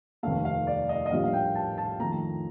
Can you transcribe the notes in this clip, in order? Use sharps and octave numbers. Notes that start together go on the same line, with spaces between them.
F1 D#2 D#3 A3 F5
F5
D5
D#5
D#5
A#1 A2 G3 A#3 F5
F5
G5
A5
A5
F2 D#3 A3 A#5